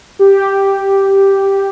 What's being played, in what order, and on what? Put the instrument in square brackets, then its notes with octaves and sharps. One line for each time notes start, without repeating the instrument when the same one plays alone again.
[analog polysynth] G4